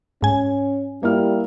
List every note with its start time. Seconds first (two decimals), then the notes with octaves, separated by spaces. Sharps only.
0.22 G#2 C#4 G#5
1.03 G3 A#3 E4 F6